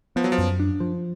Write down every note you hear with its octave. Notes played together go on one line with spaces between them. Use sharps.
F3 B3
F#3
F3
F#2
D4
F3